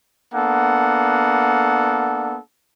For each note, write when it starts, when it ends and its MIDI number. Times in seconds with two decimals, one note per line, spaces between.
0.34 2.39 58
0.34 2.39 59
0.34 2.39 62
0.34 2.39 69
0.34 2.39 78